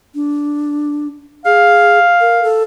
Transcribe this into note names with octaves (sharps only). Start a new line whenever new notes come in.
D4
G#4 F5
A#4
A4